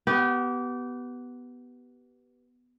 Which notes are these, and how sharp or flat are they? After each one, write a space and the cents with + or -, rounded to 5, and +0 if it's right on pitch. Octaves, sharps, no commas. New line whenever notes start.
B3 +0 G4 -25